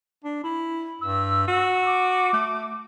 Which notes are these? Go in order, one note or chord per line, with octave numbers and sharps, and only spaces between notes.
D4
E4
G2 E6
F#4
D6
A3